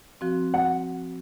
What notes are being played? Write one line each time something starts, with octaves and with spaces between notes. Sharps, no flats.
F3 C4 F#4
F#5